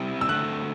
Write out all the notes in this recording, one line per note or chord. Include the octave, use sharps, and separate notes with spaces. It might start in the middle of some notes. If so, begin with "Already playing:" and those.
Already playing: C3 G3 C4 E4
E6
D3 A3 C4 F#6